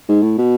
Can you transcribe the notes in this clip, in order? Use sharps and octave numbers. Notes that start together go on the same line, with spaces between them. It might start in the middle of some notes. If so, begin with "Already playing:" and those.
G#2
A2
B2